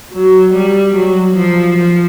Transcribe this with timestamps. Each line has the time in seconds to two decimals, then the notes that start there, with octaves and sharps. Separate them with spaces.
0.13 F#3
0.54 G3
0.95 F#3
1.36 F3
1.78 F3